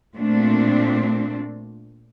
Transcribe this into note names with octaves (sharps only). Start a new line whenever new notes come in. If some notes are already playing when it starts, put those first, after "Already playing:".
A#2 A3 C4 D4